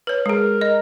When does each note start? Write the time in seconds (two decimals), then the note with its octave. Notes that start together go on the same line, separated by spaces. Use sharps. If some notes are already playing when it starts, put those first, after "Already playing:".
0.07 B4 C#5
0.26 G#3 G#4 A#4
0.61 D#5